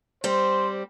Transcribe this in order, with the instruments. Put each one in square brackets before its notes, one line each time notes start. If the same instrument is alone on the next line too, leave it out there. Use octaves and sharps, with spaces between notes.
[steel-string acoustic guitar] G3 C4 [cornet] C5